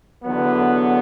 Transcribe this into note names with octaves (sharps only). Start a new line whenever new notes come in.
E2 D3 F#3 B3